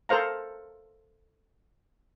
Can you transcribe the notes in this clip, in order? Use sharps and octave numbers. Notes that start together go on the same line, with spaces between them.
A4 A#4 C5 F5 A#5